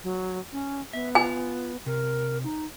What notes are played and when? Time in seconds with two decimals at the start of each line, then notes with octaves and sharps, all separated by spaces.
0.04 F#3
0.52 C#4
0.93 B3 E5
1.15 F4 G#5
1.86 C3 A#4
2.44 D#4